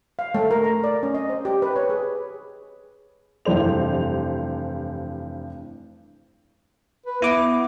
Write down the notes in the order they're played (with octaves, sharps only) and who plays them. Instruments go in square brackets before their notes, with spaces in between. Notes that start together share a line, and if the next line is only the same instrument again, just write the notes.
[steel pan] F5
A3
A#4
A#5
D5
C#4
D#5
C5
G4
B4
C#5
G#4
[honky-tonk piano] F1 G2 E3 C5 F7
[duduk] B4
[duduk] B3 [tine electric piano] E4 D6